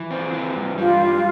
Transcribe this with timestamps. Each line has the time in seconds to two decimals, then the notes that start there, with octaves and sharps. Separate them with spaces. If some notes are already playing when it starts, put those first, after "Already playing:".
Already playing: E3
0.11 C4
0.33 E3
0.56 G2
0.78 G3 F4
1.02 G2